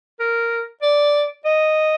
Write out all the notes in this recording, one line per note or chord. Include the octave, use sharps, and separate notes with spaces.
A#4
D5
D#5